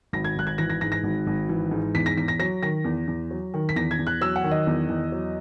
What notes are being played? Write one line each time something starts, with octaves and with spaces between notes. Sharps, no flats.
G#1 A#6
G#6
G#1 F#6
G#6
E3 A#6
A#6
G#2 A#6
A#6
G#1
G#1
E3
G#2
E2 B6
A#6
E2 B6
A#6
F#3 A#6
D#3 A#6
E2
E2
F#3
D#3
B6
E2 A#6
G#6
E2
F#6
F#3 E6
F#5
D#3
D#5
E2
E2
F#3